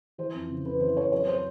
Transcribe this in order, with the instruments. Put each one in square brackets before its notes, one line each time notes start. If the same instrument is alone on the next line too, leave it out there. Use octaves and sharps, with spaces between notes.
[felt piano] E3 C5
F2
C#3
F2 B4
E3 C5
F2 C#5
F#3 C#5
C5